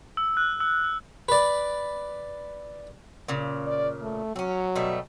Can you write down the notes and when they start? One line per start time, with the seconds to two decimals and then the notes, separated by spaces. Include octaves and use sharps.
0.17 E6
0.37 F#6
0.60 E6
0.84 E6
1.29 B4 D5
3.28 A#2 C#3
3.67 D5
4.02 A3
4.36 F#3 C4 C#4
4.75 B2 G3 A3